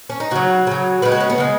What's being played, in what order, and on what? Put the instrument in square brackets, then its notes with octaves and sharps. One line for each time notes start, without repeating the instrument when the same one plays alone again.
[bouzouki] C#4
D#4
C#3 F#3 F#4
C#3 F#3
C#3 G#3 B4
F#4
C#4
B3
C#3 G#3